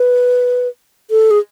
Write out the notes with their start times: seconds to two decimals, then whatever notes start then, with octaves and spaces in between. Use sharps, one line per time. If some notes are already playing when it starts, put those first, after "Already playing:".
Already playing: B4
1.11 A4
1.31 G#4